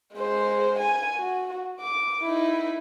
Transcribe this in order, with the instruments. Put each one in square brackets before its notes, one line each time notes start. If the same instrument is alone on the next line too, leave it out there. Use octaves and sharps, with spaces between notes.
[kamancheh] G#3 C5
G#5
F#4
D6
D#4 E4